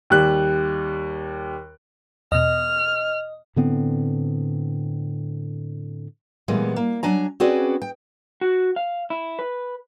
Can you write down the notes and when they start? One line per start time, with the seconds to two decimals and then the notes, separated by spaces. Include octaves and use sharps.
0.10 D#2 G3 F#6
2.32 E2 B2 D#5 F6
3.56 A2 D3 B3 C4
6.48 A#2 E3 G3 G#3 B3
6.76 A#3
7.03 F#3 D4 G#5 A#5
7.40 C4 C#4 F#4 G#4 B4 D5
7.82 G5
8.41 F#4
8.76 F5
9.10 E4
9.39 B4